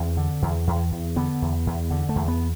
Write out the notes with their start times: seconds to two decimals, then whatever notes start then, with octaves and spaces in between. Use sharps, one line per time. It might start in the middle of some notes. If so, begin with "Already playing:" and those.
Already playing: E2 C4
0.17 D3
0.42 E2
0.67 E2
0.92 E2
1.16 D3 B3
1.42 E2
1.67 E2
1.90 D3
2.09 A3
2.16 E2
2.28 B3